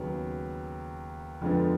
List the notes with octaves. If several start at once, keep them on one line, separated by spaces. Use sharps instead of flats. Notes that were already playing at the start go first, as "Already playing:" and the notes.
Already playing: D#2 C#3 F#3 B3
F2 D3 F3 G#3 B3